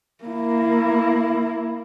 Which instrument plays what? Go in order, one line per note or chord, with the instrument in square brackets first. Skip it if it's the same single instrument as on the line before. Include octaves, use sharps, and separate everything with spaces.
[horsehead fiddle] A#3 E4